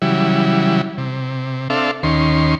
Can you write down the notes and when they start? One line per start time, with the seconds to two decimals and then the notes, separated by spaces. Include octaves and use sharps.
0.02 C#3 E3 F#3 G3 E4
0.98 C3
1.70 C4 D4 A4 E5 F5
2.03 D#2 D#3 C#4 C6